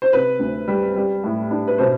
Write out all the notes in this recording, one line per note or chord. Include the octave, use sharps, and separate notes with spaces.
C5
C3 B4
D2
G3
G3
A2
D4
B4
B2 C5